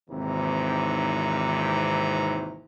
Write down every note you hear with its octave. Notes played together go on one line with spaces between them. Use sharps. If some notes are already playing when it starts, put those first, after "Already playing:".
G#1 D#2 C3 E3 A#5